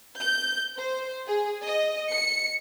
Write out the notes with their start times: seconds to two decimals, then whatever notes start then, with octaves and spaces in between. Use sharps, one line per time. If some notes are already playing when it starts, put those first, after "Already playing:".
0.19 G6
0.78 C5
1.25 G#4
1.65 D#5
2.12 C#7